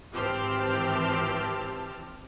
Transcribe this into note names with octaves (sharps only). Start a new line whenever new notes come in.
G#1 E3 C4 G4 A5 F6